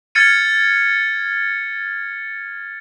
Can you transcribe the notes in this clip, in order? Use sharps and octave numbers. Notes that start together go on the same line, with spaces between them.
F6 G#6 A6 C#7 D#7